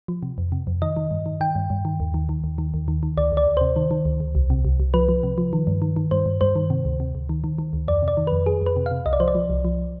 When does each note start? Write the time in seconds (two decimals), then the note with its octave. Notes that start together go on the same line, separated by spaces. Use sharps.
0.08 F3
0.23 C3
0.38 F2
0.52 C3
0.67 F2
0.82 D#3 D#5
0.97 D#3
1.11 G2
1.26 D#3
1.41 D#3 G5
1.55 G2
1.70 G2
1.85 D#3
2.00 D#2
2.14 D#3
2.29 D#3
2.44 D#2
2.58 D#3
2.74 D#2
2.88 D#3
3.03 D#3
3.17 D2 D5
3.32 D2
3.37 D5
3.47 D2
3.57 C3 C5
3.76 D#3
3.91 D#3
4.05 D2
4.20 D2
4.35 C2
4.50 C3
4.65 C2
4.80 C2
4.94 F3 B4
5.09 F3
5.23 C3
5.38 F3
5.53 D#3
5.67 G2
5.82 D#3
5.96 D#3
6.11 G2 C5
6.26 G2
6.41 G2 C5
6.56 D#3
6.70 C3
6.85 D2
7.00 C3
7.15 D2
7.29 D#3
7.44 D#3
7.58 D#3
7.73 D2
7.88 F2 D5
8.02 C3
8.08 D5
8.17 D#3
8.27 F2 B4
8.46 F2 G#4
8.61 F2 B4
8.76 C3
8.86 F5
8.91 C3
9.06 C2 D#5
9.13 D5
9.20 F3 C5
9.28 D5
9.35 F3
9.50 C2
9.65 F3